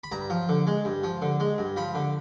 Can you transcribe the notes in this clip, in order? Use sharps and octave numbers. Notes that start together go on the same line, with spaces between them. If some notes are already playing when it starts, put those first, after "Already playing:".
B5
G2 A#5
F3
D3
G#3
G2
F3
D3
G#3
G2
F3 B5
D3